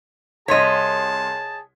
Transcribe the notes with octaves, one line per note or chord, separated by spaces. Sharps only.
C2 G#4 C#5 D#5 A5 C6 B6